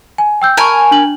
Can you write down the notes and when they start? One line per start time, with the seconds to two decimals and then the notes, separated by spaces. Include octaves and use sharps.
0.18 G#5
0.42 G5 E6 G6
0.57 A#4 G#5 A5 B5 C#6
0.91 D4 F#7